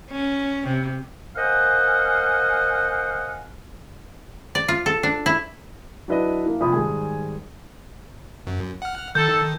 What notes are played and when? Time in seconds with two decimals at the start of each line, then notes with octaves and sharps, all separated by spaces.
0.11 C#4
0.68 C3
1.36 A#4 C5 D#5 F5 F#5 G#5
4.55 D5
4.68 F4
4.86 A4
5.03 D4
5.26 E4
6.08 F#3 D4 E4 B4 D5 D#5
6.46 E3 A#3
6.60 F1 A#1 F2 B5 D#6
6.72 G#2 D#3 G3 G#4 G#5
8.47 F#2
8.82 F#5 F6
9.15 D#3 A4 G6